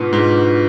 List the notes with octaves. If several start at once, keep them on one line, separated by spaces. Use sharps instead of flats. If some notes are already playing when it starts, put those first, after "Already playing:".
Already playing: G#2 B2 D4 F4 B4
G#2 D4 F4 B4